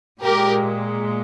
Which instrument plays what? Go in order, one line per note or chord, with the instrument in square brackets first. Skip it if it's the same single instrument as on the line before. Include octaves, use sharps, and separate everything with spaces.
[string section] A#2 G#3 G4 A#4